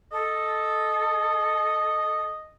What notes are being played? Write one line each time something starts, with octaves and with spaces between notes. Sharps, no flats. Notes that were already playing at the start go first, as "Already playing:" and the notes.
A4 D#5